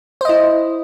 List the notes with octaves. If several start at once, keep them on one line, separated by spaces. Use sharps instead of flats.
E4 C5 D#5